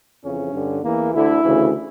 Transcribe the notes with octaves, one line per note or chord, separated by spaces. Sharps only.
F2 C#3 E3 C#4
G2 D3
E2 E3 A#3
D2 D3 E4
D2 C#3 E3